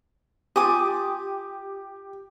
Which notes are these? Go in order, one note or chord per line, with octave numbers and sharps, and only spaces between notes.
F4 G4 G#5 D6 D#6